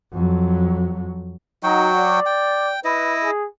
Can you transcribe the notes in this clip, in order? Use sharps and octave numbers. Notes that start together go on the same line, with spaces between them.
F2 F#3
F#3 D#4 F#4 G5
D5
G5
E4 B4 D#5
G#4